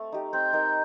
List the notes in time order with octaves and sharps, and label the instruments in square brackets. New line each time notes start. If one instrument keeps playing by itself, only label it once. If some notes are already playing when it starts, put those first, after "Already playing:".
Already playing: [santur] A3 C4 A4
D#4 G4
[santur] C4 [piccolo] G6
[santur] D#4 A#4